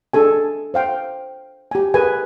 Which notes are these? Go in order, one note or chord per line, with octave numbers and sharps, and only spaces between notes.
D4 G#4 A4 G#5
C5 F5 G5
G4 G#5
G#4 A#4 B4 G#5